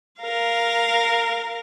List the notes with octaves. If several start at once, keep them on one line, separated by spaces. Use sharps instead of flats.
A#4 F5